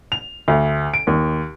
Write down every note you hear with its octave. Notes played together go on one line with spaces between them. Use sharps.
F7
D2
D7
D#2